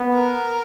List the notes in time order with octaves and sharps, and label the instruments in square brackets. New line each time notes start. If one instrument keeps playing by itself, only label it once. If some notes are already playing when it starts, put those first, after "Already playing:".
Already playing: [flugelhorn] B3
[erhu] A#4